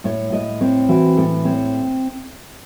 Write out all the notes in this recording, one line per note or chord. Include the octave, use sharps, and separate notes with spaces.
A2 C#5
A2 D#5
C4 C#5
E3 F#4
A2 A4
C4 C#5